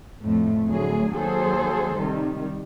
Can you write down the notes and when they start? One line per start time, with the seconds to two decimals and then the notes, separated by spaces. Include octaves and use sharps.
0.21 F2 A2 A3
0.67 D2 A2 F#3 G#4
1.15 D#2 F#3 G#4 A4 C5
1.97 C3 D#3 G3